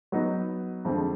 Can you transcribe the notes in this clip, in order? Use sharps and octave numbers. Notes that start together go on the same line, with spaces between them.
F#3 B3 D#4
F2 D3 F3 G#3 C4